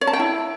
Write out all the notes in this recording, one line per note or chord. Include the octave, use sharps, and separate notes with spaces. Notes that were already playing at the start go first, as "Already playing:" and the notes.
C#5
A5
G5
E4